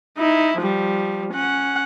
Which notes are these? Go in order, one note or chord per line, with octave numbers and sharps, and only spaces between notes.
D#4 E4
F3 G3
C#4 F#5